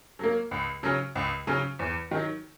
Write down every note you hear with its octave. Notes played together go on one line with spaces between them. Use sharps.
F#3 A#3
C#2
C#3 F#3 C#4
C#2
C#3 F#3 C#4
E2
D#3 F#3